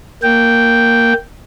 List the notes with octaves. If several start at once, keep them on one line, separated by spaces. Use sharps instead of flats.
A#3 G5